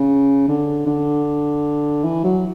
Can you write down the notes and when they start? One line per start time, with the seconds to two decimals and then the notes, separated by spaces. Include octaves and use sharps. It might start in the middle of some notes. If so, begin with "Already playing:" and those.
Already playing: C#3
0.48 D3
0.87 D3
2.04 E3
2.24 F#3